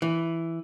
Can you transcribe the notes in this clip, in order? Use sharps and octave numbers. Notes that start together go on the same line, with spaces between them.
E3